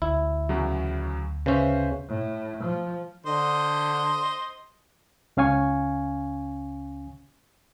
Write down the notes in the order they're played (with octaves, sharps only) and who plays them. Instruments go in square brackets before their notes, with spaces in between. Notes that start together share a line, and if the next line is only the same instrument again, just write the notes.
[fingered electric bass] D2 [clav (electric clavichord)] E4
[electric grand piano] E2 C#3 F#3
[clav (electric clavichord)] C#3 C#4 [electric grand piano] B4 C5 E5
[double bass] A2
F3
[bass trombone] D3 [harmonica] C5 D#5
[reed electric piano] C#2 C#4 F5 G#5 C#6